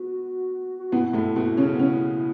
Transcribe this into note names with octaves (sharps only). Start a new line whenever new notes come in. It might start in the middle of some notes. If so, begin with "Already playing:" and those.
Already playing: B3 F#4
F#4
B2 B3 E4
A2 A3
B2 B3
C#3 C#4
B3
C#3 C#4